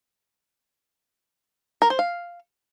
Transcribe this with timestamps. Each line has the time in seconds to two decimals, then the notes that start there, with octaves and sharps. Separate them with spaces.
1.82 A#4
1.90 C5
1.99 F5